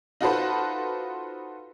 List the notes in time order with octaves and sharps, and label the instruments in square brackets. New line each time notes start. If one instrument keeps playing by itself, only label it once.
[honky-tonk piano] D#4 F4 F#4 A4 B4 C5